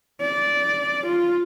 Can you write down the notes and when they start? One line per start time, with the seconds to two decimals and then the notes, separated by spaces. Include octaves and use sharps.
0.21 D5
1.07 F4